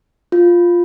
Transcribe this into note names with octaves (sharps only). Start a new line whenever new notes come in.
F4